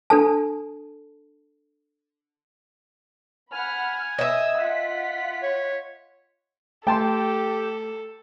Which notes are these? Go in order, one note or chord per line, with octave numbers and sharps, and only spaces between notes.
D4 A4 A5
F#5 G#5 B5 F6
D#5 E5 D#6 E6
F4 F#5 B6
C#5
A3 G4 A4 G5 A5 C6